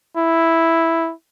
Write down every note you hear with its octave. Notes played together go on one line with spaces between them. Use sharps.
E4